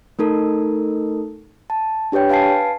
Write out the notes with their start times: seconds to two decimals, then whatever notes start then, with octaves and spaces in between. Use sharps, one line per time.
0.19 A3 D#4 A4 A#4
1.70 A5
2.12 D4 G4 B4 C#5 G5
2.29 B4 F5 G#5 A5 C7